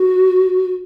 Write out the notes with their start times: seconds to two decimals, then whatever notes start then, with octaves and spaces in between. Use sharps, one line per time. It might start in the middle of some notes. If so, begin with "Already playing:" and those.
Already playing: F#4